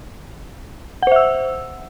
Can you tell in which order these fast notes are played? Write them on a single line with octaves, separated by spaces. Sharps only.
F#5 C5 E5 E6